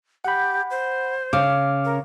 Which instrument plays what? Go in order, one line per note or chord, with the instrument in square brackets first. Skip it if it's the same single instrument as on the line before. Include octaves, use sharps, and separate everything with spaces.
[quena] G4 [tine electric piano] F#5 B5
[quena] C5
[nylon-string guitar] C#3 [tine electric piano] D6 F6
[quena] A#4